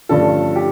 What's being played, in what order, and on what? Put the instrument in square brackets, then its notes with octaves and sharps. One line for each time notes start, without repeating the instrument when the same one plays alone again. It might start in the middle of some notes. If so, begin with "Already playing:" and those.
[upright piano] G2 D3 F3 A3 C#4 A4
G4